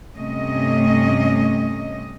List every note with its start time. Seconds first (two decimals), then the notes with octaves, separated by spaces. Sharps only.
0.16 G2 C3 A3 C#4 D#5